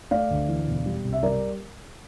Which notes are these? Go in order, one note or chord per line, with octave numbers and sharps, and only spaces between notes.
A3 D5 F5
D2
E3
E1
G3
C2
E5
G3 A#4 D5